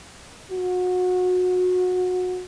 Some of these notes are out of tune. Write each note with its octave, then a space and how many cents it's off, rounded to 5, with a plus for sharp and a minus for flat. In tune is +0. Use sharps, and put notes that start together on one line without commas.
F#4 -25